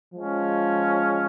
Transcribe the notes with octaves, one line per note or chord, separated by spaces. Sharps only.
F3 G#3 C#4